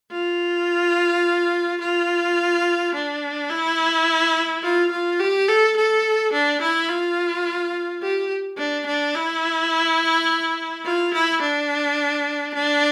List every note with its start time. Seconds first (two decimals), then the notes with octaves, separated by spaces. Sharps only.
0.11 F4
1.80 F4
2.94 D4
3.50 E4
4.63 F4
4.91 F4
5.19 G4
5.48 A4
5.76 A4
6.33 D4
6.61 E4
6.89 F4
8.02 G4
8.58 D4
8.86 D4
9.15 E4
10.85 F4
11.13 E4
11.41 D4
12.54 D4